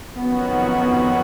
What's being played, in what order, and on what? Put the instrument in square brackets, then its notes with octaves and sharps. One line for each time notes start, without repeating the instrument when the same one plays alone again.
[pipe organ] F2 D#3 F#3 C#4 F#4 [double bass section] B3